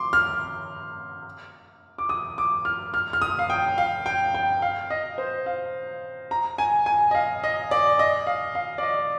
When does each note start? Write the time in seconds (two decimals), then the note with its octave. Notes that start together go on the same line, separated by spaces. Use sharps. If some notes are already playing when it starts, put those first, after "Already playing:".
Already playing: C6 D6
0.13 F6
1.98 D6
2.09 D#6
2.38 D6
2.65 F6
2.94 F6
3.13 F6
3.22 D#6
3.39 F5
3.50 G5
3.78 F5
4.06 G5
4.34 G5
4.62 F5
4.90 D#5
5.18 C5
5.46 F5
6.31 A#5
6.58 G#5
6.86 G#5
7.11 D#5
7.15 F5
7.44 D#5
7.71 D5
7.99 D#5
8.27 F5
8.55 F5
8.78 D5
8.83 D#5